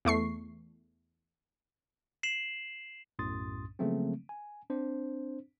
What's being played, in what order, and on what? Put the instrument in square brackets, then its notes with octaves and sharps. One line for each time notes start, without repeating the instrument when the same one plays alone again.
[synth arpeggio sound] E2 A3 C#6 C7
[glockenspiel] C7 E7 F#7
[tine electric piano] B1 F#2 A2 C6 D#6 A6
C#3 F3 F#3 A3 A#3 C4
G#5
C4 D4 C5